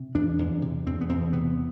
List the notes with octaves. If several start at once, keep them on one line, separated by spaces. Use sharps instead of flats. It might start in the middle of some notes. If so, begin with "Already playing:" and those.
Already playing: C3
E2 D4
E2
C3
E2 C4
B3
E2 C4
C3 B3